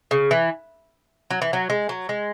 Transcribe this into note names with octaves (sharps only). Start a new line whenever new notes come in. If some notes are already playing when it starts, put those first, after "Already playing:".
C#3
E3
F#3
E3
F#3
G#3
F#3
G#3